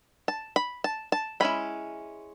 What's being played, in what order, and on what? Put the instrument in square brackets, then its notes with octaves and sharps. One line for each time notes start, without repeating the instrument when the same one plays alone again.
[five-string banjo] A5
B5
A5
A5
G#3 C#4 E4 B5